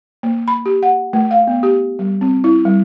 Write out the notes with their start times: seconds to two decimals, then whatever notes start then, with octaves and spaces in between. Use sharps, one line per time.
0.23 A#3
0.48 B5
0.66 G4
0.83 F#5
1.13 A3
1.31 F5
1.47 B3
1.63 G4
1.99 G3
2.21 C4
2.44 E4
2.65 G3